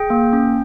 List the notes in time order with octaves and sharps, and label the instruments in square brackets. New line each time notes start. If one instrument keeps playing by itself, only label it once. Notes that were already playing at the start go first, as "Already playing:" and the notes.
Already playing: [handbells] G#4 G5
A#3
C#4